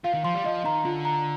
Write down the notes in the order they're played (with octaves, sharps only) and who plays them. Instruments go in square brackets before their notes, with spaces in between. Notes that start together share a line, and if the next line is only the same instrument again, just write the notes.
[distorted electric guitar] F3 [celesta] F5
[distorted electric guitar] D#3
[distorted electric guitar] F3 [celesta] C6
[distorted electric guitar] G3
[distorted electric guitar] F3 [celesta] D#5
[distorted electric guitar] D#3 [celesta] A#5
[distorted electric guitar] D3 [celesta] F4
[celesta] A#5